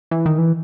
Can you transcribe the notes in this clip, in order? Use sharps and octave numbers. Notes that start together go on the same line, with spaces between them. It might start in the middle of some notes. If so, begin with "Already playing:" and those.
E3
D#3
E3